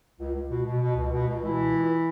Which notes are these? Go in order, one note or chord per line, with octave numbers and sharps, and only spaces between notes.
C#2
C#2
B2
B2
B2
C#2
B2
C#2
B2 E3 E4
C#2
C#2